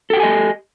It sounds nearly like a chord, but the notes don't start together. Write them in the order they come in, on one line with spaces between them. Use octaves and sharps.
A4 G5 G4 G#5 D#5